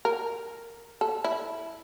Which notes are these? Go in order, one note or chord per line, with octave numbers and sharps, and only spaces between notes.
A#4
A4
E4